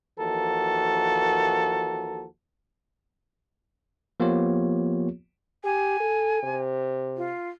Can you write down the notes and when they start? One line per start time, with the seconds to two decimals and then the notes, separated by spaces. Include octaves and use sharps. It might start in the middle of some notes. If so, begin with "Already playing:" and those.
0.19 D#2 E3 F3 F#4 A4 A#4
4.20 F3 A#3 B3 F4 G4 C#5
5.64 G4 G#5
6.00 A4
6.43 C3
7.17 F4